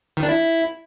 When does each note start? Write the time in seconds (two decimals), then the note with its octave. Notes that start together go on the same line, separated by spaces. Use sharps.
0.17 D#3
0.23 D4
0.29 E4